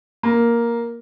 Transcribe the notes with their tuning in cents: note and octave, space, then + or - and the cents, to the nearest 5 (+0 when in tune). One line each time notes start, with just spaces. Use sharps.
A#3 +5